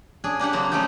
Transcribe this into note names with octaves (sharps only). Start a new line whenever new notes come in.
C#4 D4 G#4
A#3 D4 G4 F#5
C#3 F#3 A#3 C4
A3 A#3 C#4 D#4 G4